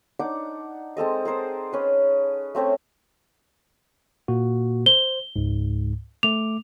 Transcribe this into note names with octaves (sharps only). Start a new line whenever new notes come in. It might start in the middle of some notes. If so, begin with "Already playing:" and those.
D4 D#4 F#5 D6
G#3 C4 A4 D#5
G#4 A#4 C5 A5
C#4 B4
A3 C4 C#4 E5
A#2 A#3 F#4
C5 G7
C#2 G#2
A3 D6 F7